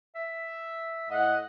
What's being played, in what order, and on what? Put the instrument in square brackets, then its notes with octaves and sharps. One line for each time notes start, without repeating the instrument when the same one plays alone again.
[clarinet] E5
[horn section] A2 F#5 [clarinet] D#5